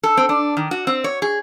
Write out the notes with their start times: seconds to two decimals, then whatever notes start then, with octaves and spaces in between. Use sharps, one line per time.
0.03 A4
0.17 C4
0.29 D4
0.57 D#3
0.71 F#4
0.87 C4
1.04 C#5
1.22 G#4